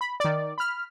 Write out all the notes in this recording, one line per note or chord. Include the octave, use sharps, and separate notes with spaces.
B5
D#3 D5
B5 F6